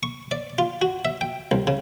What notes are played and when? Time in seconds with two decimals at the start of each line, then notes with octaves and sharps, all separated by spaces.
0.03 C#6
0.31 D5
0.58 F4
0.82 F#4
1.05 E5
1.21 G5
1.51 C2
1.67 C#3